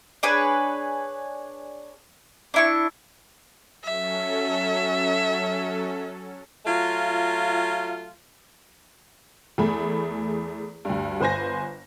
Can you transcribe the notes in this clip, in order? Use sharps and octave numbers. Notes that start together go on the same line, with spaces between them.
D4 G#4 B4 C#5
D4 E4 C#6
F#3 C#4 A4 E5
F#3 A3 F4
E2 A3 G#4 B5
D2 G2
G1 B4 C5 G#5 A#6